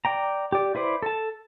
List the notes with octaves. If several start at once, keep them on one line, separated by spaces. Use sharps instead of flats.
D5 G5 A#5
G4 D5
E4 B4 C5 D5
A4 A5